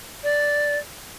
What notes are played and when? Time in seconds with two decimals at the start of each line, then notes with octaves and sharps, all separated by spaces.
0.24 D5